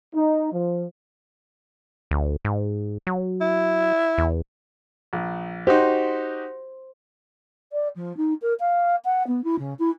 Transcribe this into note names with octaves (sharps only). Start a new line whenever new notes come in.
D#4
F3
D2
G#2
F#3
E4
E2
A#1
D#4 F#4 G4 C5
D5
F3
D#4
A#4
F5
F#5
B3
E4
C#3
E4